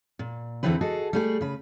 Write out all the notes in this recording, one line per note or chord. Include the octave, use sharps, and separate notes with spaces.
A#2
E2 B2 D3 E3 C4 B4
F#4 G#4 A4 D#5
G3 A3 G#4
C#3 B4